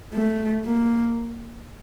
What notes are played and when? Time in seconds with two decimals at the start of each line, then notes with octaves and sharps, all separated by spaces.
0.13 A3
0.65 A#3